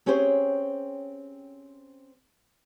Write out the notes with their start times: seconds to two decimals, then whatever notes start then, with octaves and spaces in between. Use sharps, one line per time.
0.06 C4 C#4 G4 G#4 C5 C#5